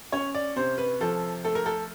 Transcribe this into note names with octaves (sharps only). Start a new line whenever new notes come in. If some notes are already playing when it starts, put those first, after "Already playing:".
C#4 C#5
D5
C3 C5
B4
F3 A4
A3 A4
A#4
A4